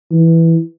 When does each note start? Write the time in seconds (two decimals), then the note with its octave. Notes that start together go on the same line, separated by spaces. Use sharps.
0.11 E3